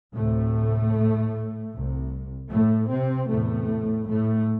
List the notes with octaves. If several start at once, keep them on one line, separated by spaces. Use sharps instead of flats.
D2 A2 C3 A3
C2 C3
A2 A3
C3 C4
E2 A2 C3 A3
A2 A3